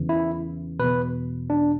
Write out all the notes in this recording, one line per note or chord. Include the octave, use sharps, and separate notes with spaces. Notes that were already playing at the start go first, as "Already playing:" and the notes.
Already playing: E2 C#3 E3
E4
E2 B2 B4
D4